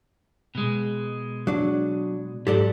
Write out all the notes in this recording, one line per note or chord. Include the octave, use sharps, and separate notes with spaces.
B2 G#3
F#3 D4
G#2 F#3 G4 A4 D5